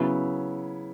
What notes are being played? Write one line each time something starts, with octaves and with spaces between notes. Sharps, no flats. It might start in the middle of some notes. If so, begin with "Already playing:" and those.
Already playing: C#3 F#3 B3 E4